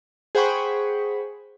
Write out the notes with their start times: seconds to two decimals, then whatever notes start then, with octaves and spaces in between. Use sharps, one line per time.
0.35 G#4 C5 F#5 G5 B5 C#6